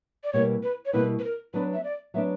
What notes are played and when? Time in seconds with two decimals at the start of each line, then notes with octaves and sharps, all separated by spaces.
0.24 D5
0.33 B2 G3 A#3 E4 C#5
0.63 B4
0.86 C#5
0.93 B2 G3 A#3 E4 B4
1.19 B4
1.24 A#4
1.54 F#3 B3 D4 B4
1.74 E5
1.84 D5
2.14 F#3 B3 D4 E5